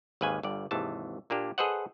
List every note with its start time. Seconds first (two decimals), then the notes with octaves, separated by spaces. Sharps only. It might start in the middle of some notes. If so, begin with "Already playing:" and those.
0.21 G#1 D#2 B4 F5 G#5
0.43 G1 G2 D5
0.71 G#1 D#2 C3 E3 A5
1.30 A#2 A#3 D4 G4
1.58 G#4 A4 B4 C5 D#5 F#5